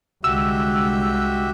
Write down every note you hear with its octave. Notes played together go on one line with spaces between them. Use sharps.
C2 D3 G#3 F#4 G4 E5 E6